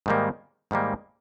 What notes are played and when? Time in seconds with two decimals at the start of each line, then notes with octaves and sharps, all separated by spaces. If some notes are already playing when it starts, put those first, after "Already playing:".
0.06 G#2 D#3 G3 A#3
0.71 G#2 D#3 G3 A#3